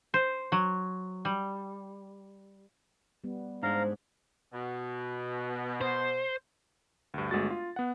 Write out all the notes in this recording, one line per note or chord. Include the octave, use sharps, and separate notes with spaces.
C5
F#3
G3
G3 B3
G#2 G#3 D4 C5 F5 A#5
B2
C5
D2 G2
G1 G#3 A3 F#4 A6
F4
B3 F#5